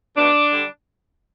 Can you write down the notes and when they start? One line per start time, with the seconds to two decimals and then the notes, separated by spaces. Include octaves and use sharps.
0.16 B2 A3 D4
0.52 D3 G3